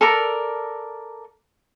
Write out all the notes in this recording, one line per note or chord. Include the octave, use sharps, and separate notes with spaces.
A4 A#4 D5 A#5